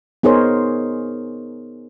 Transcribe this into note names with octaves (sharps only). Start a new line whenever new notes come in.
B3 D#4 G#4 A#4 C5 C#5